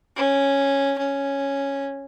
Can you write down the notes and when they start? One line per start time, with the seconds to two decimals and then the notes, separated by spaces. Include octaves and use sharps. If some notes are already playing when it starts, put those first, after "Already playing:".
0.16 C#4
0.98 C#4